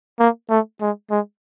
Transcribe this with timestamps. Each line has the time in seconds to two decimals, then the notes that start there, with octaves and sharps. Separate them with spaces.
0.19 A#3
0.50 A3
0.81 G#3
1.11 G#3